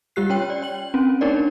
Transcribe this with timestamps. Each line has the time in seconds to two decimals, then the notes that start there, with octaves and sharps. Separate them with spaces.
0.16 G3 F4 G4 F#6 C7
0.30 C#4 C#5 G5
0.50 D5
0.62 G5 F#7
0.94 C4 C#4
1.21 A#3 D4 D#4 A#4 C#5 D5